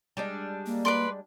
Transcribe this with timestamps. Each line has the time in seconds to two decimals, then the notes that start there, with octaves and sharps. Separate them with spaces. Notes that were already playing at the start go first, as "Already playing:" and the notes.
0.17 G3 G#3 D4
0.66 A#3
0.85 B4 D5 C6